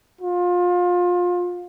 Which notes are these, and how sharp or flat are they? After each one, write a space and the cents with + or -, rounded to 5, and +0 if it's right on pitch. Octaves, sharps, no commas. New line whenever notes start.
F4 +25